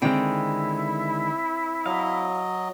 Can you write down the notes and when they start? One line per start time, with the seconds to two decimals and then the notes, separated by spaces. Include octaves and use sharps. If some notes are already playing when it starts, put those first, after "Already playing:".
0.02 D3 D#3 G#3 C4 E4 G5
1.86 F#3 D#5 F5